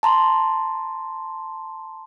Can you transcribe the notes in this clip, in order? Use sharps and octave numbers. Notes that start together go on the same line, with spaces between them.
A5 A#5 C6